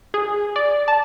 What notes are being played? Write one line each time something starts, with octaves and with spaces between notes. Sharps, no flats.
G#4
D5
A5